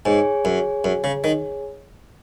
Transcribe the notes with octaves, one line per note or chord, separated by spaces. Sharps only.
G#2 G#4 C#5 G#5
F#2
F#2
C#3
D#3